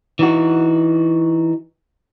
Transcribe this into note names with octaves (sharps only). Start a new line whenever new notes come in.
E3 D#4 F#4